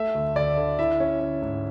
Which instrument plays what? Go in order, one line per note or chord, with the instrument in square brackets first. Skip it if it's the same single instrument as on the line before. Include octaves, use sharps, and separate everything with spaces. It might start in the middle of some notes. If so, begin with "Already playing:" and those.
Already playing: [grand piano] A3 E5
D2
D2 D5
D3
E4 E5
C#4
C#4
G#2